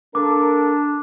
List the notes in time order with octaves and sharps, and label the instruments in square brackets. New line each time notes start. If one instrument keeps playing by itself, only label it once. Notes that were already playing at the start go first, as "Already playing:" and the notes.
[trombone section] A#3 A4 A#4 [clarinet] D4 [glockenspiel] D6